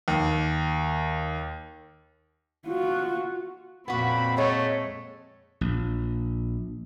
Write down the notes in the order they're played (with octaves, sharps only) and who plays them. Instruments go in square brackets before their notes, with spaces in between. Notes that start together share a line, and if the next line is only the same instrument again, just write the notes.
[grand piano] D#2
[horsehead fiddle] F4 F#4
[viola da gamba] F2 A#2 C4 [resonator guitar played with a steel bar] B3 F#4 [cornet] B5
[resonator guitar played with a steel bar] G#3 [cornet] A3 [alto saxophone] C#5
[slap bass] A#1